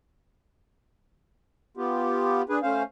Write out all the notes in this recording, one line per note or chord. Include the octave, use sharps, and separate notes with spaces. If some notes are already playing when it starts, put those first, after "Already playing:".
B3 F4 G4
D4 G#4 B4
A3 C#4 C5 F5